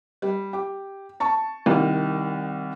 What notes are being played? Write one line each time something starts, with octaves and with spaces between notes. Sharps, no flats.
G3
G4
A5 C#6
C2 D#3